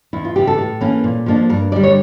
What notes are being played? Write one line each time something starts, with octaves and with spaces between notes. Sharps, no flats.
E2 E4
F4
C#3 E3 G4
A4
A2
E3 A#3 C#4
A#2
F3 A#3 D4
G2 A#4
D3 G3 D5
C#5